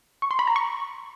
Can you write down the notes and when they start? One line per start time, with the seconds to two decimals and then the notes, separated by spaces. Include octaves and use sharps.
0.22 C#6
0.31 C6
0.39 B5
0.47 A#5
0.56 C#6